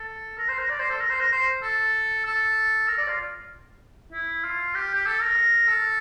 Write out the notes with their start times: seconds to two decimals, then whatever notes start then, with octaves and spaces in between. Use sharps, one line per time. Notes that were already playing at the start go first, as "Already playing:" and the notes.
Already playing: A4
0.38 A#4
0.48 C5
0.58 A#4
0.69 D5
0.80 C5
0.90 A4
1.00 A#4
1.10 C5
1.20 A#4
1.32 C5
1.63 A4
2.25 A4
2.88 A#4
2.98 D5
3.07 F4
4.13 E4
4.43 F4
4.74 G4
4.95 G4
5.06 A4
5.21 A#4
5.67 A4